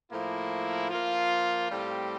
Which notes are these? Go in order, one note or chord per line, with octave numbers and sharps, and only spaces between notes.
A2 F3 A#3 E4
F3 A#3 F4
A2 G3 C4 G4